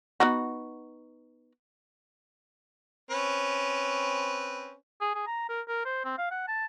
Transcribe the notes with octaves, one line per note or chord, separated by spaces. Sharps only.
B3 D#4 F#4
C4 C#4 B4
G#4
G#4
A#5
A#4
A#4
C5
C4
F5
F#5
A5